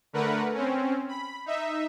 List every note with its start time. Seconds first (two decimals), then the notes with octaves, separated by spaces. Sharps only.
0.13 D3 A3 A#4 B4 F#5
0.53 C4 C#4
1.08 B5
1.46 D#4 E5